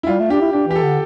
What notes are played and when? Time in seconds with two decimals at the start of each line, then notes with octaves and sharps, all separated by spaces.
0.03 E4
0.07 G3 F4
0.19 A3
0.30 D4 G4
0.41 E4
0.52 D4 G4
0.68 E3 G4
0.76 A4
0.83 D3